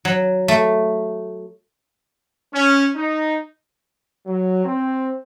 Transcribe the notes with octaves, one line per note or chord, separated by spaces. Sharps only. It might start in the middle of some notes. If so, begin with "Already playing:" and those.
F#3
A3
C#4
D#4
F#3
C4